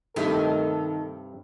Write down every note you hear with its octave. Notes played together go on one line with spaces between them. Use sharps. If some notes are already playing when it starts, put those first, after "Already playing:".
G2 C3 D#3 A3 E4 A4